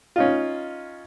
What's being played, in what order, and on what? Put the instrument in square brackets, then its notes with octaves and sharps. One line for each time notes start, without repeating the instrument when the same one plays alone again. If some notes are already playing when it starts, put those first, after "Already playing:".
[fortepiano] C#4 D#4 F4